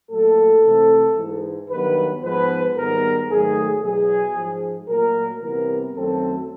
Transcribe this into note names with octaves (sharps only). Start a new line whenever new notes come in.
A#2 F#3 A3 A4
C3 E3 A3 C4
G#2 E3 G#3
G2 D#3 F#3 B3 B4
G#2 F3 G#3 B3 B4
G#2 D#3 G3 B3 A#4
G#2 D#3 F#3 A3 G#4
E2 B2 F#3 G#4
G#2 F3 G#3
A#2 F#3 A3 A#4
C3 E3 G3 B3 A#4
F#2 D#3 F#3 A3 C4 A4